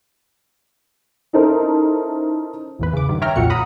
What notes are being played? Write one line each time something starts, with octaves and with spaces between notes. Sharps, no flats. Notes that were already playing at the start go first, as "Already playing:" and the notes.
C#4 D#4 E4 A4 A#4 C5
A1 E2 B4
C#3 D6
G2 D#3
C#5 E5 G5 A#5 F6
B1 F2 A#2 F#4 C#7
F#5 A#5 B5 D#6